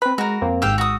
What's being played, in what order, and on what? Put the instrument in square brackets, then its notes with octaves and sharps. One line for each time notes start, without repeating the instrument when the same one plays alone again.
[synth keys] C4 B4 [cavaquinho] B5
[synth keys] G#3 [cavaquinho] F#4 A#4
[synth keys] F2 A#3 C4
[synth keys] G#1 G#2 E6 [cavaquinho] G4 F5 G5
[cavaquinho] F#4 D#6